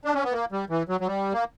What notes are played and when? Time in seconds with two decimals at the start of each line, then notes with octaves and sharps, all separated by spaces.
0.05 D4
0.14 C#4
0.24 B3
0.32 A#3
0.52 G3
0.70 E3
0.89 F#3
1.01 F#3
1.07 G3
1.33 A#3